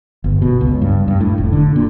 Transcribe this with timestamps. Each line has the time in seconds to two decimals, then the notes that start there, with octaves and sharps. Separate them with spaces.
0.24 G1
0.42 B2
0.61 C#2
0.82 G2
1.08 G2
1.21 A2
1.38 F1
1.53 D3
1.76 A#2